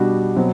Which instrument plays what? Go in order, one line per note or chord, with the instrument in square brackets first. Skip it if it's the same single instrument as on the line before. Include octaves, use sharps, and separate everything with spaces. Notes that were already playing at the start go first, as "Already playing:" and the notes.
Already playing: [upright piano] B2 G3 D4 F#4
B2 F#3 C4